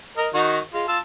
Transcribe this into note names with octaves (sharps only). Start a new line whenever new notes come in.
A#4 D#5
D#3 D#4 F#4
G#3 F4
F4 A5 E6